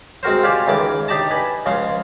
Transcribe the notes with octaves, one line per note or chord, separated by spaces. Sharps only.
G#3 C4 F#4 A#4 C5
F4 G4 D5 G#5
C#2 D#3 E3 D6
D4 D#4 G4 D5 D#5 A5
B4 G#5
C#2 F3 G#3 C6